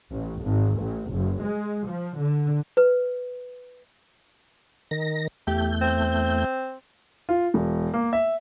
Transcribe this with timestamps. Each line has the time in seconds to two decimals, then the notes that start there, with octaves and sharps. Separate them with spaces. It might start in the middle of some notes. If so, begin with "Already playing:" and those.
0.11 A1
0.41 G#1
0.78 A1
1.12 F#1
1.42 G#3
1.87 F3
2.18 D3
2.77 B4
4.91 D#3 A#6
5.47 E2 A3 G4 G6
5.81 C4
7.29 F4
7.54 E1
7.94 A#3
8.13 E5